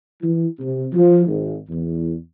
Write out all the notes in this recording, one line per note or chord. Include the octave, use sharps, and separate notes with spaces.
E3
C3
F3
G#1
E2